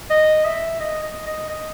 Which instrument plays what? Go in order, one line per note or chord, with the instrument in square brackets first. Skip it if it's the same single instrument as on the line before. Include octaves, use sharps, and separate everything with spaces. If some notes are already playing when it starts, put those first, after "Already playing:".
[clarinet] D#5
E5
D#5
D#5
D#5
D#5